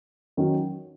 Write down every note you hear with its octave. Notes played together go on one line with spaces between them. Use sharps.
D#3 F#3 C#4